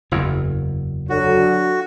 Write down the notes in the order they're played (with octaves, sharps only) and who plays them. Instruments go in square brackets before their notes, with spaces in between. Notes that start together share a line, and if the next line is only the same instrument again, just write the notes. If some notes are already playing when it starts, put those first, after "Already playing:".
[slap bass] F#1 E2
[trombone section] D3 F#3 [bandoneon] F#4